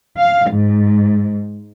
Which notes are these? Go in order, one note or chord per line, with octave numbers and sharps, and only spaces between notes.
F5
G#2